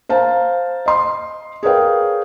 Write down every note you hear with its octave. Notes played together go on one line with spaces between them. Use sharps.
C5 F5 A5 A#5
D#5 C6
G#4 A#4 B4 C#5 F5 G5